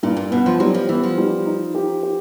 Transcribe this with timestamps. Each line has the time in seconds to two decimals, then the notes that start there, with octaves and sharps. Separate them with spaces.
0.03 G2 A#2
0.17 A#2
0.31 B2 B3
0.46 F3
0.60 F#3 G3
0.74 F3
0.89 E3 B3
1.03 F3
1.18 G3
1.46 D#4
1.75 G4
2.03 G4